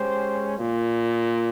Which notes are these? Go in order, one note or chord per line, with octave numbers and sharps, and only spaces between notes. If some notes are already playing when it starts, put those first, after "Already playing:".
Already playing: G#3 C#4 G4 C5
A#2